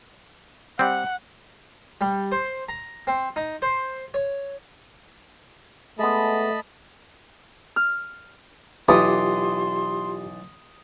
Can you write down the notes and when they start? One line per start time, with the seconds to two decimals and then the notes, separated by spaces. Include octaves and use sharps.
0.79 G3 C4 F#5
2.01 G3
2.32 C5
2.69 A#5
3.07 C4
3.36 D#4
3.62 C5
4.14 C#5
5.99 G#3 A3 B3 D#5 A5 B5
7.76 F6
8.89 B1 E3 F4 G4 A4 C6 D6 D#6